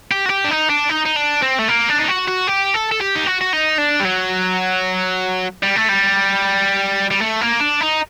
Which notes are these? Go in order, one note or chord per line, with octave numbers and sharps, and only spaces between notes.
G4
F#4
G4
D4
D#4
D4
D#4
D#4
D4
C4
A3
A#3
D4
D#4
F#4
F#4
G4
A4
A4
G4
D#4
F#4
F#4
D#4
D4
G3
F#3
G3
A3
G3
G3
A3
A#3
D4
D#4